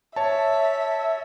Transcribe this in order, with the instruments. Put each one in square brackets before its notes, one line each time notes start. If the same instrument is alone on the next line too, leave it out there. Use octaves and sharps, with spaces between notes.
[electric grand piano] C#5 A5 [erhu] E5